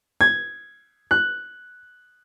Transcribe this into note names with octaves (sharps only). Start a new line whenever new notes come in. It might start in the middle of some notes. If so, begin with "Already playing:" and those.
G#6
F#6